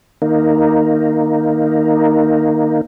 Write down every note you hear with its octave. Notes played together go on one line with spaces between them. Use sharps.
D#3 A#3 D#4